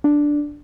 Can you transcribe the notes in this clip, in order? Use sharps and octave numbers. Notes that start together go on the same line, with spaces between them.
D4